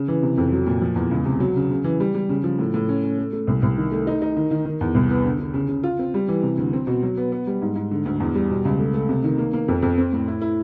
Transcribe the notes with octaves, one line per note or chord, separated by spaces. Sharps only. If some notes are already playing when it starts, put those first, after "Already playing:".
Already playing: C#3
E3
C3
F2
F#3
A#2
F3
E2
C#2
C3
F#3
C#3
C#3
E3
G3
G3
C#3
F3
A2
A2
C#4
C#4
A3
A3
C2
C2
D#3
A3
D#4
D#4
D#3
D#3
D#3
E2
C2
B3
D3
D3
C#3
C#3
F4
C4
G3
E3
C3
D2
C4
B2
F#3
B3
B3
G3
G#2
G#2
D3
D2
E2
G3
B2
C#2
A3
A3
C3
D#3
A#3
A#3
F2
F2
C4
A2
E4
E4